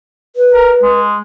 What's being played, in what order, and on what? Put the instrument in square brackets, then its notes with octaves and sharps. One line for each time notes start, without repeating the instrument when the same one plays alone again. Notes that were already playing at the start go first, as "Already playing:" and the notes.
[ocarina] B4
[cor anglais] A#4
G#3